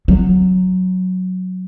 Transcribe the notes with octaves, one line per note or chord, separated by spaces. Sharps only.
F#3